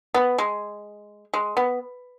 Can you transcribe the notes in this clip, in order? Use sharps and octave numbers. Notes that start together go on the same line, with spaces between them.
B3
G#3
G#3
B3